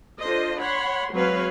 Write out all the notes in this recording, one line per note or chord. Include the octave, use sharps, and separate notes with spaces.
D4 F4 A4 C5 D#5
C#5 F#5 B5 C6
F#3 G#3 C4 B4 C#5 F5